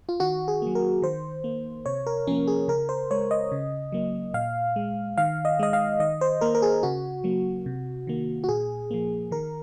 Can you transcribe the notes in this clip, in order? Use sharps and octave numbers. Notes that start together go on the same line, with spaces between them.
F4
D#3 F#4
G#4
F#3 A#3
A#4
D#3 C5
A#3
C3 C#5
A#4
F3 A#3 C#4
G#4
C#3 A#4
C5
G#3 C#5
D#5
C#3
F#3 A#3
A#2 F5
G#3
D#3 F5
D#5
G#3 D#5
F5
D#3 D#5
C5
A#3 A#4
A#4
G#4
C#3 F#4
F#3 A#3
C3
D#3 A#3
F#4
A#2 G#4
F3 A#3
D#3 A#4